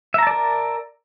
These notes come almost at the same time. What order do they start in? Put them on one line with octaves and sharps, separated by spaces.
E5 A#5 A5 D5 A#4